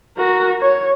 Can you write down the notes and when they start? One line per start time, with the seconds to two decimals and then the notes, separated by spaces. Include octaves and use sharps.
0.17 F#4 A#4
0.61 C#5